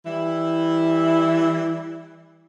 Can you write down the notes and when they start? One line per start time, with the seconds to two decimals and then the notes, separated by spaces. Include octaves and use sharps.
0.07 E3 G3 E4